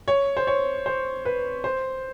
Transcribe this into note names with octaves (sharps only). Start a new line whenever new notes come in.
C#5
C5
C#5
C5
B4
C5